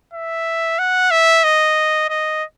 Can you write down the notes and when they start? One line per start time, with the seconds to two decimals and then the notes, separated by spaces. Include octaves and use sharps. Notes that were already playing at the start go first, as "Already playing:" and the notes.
0.13 E5
0.78 F#5
1.11 E5
1.44 D#5
2.09 D#5